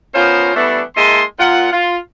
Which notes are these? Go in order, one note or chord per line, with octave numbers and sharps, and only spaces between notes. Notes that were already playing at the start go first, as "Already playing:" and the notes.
F3 B3 C#4 F4 A#4 C5
E3 G3 A3 B3 D4
G#3 A#3 E4 D#5 A5 C6
A#2 F4 F#5
F4